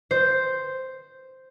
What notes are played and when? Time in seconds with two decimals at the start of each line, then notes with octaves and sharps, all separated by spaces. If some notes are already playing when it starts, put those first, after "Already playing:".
0.11 C5